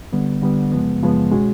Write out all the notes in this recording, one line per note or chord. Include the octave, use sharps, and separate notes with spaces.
D3 G3 B3
D3 G3 B3
F#2 C#3 F3 G#3 B3
F#2 C#3 F3 G#3 B3
B2 G#3 C#4 F#4